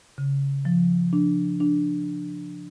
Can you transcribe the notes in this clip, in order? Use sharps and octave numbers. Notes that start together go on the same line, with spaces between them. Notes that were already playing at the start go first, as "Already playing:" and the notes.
C#3
F3
D4
D4